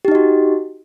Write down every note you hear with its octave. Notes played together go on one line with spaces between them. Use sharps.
D#4 F#4 G4 D#5